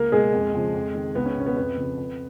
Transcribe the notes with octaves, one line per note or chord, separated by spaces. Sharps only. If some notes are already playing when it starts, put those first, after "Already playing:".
Already playing: C#2 A#3 A#4
B2 G#3 G#4
F2
C#3 F3
F2
D#3
C#2 B3
C#4
B2 C#4
B3
F2 B3
C#3 F3
F2